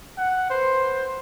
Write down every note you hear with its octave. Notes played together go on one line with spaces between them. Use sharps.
F#5
B4 C5